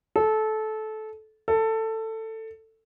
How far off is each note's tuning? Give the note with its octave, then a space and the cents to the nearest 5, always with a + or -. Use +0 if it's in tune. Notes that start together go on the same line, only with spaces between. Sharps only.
A4 -20
A4 +15